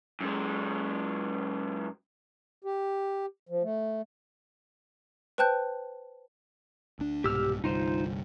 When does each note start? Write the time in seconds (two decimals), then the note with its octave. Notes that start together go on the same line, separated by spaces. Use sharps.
0.20 F#2 G#3
2.64 G4
3.49 F3
3.63 A3
5.38 B4 C5 G5 A5 F#6 G6
6.99 D2 D4
7.24 C2 G#2 B2 G4 E6 F6
7.64 G1 C2 G2 D#4 F4 C5